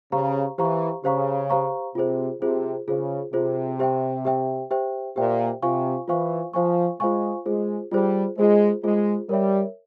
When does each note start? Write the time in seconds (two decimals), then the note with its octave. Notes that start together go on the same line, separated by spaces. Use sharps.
0.12 C#3 G4 C5 F5 A#5 C#6
0.58 E3 G4 C5 F5 A#5 C#6
1.04 C#3 G4 C5 F5 A#5 C#6
1.50 G4 C5 F5 A#5 C#6
1.95 C3 F4 G#4 C5
2.41 C3 F4 G#4 C5
2.87 C#3 F4 G#4 C5
3.33 C3 F4 G#4 C5
3.79 G4 C5 E5 G5
4.25 G4 C5 E5 G5
4.71 G4 C5 E5 G5
5.16 A#2 G4 C5 E5 G5
5.62 C3 F4 C5 F5 G#5 C#6
6.08 E3 F4 C5 F5 G#5 C#6
6.53 F3 F4 C5 F5 G#5 C#6
7.00 G#3 F4 C5 F5 G#5 C#6
7.46 G#3 F4 G#4 C5
7.92 G3 F4 G#4 C5
8.38 G#3 F4 G#4 C5
8.83 G#3 F4 G#4 C5
9.29 G3 A#4 C#5 E5